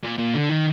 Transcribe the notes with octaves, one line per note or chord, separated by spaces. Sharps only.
A#2
A#2
D3
D#3